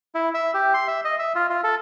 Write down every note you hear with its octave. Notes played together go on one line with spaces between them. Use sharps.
E4
E5
G4
C6
E5
D#5
E5
F4
F4
A4